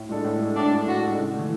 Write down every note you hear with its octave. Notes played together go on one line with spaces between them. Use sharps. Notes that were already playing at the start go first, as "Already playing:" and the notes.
Already playing: A2
G#3 D4 A4
A2
G#3 D4 A4
A2 D4
G#3 D4 A4
A2 F#4
G#3 D4 A4
C#3
A3
E3